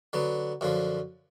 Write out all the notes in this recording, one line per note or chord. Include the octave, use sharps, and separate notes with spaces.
D3 F#3 B3
F#2 D3 F3